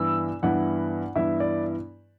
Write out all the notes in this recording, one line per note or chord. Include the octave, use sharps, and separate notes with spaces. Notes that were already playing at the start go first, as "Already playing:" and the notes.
Already playing: G2 E3 B3 E4 E6
G2 E3 B3 E4 F#5
G2 E3 B3 E4 E5
D5